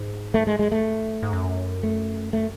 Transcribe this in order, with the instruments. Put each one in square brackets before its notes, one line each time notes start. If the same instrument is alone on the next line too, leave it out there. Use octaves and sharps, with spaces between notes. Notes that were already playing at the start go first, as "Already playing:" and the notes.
Already playing: [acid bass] G#2
[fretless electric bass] A3
G#3
G#3
A3
[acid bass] G#2
F#2
[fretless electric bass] A3
A3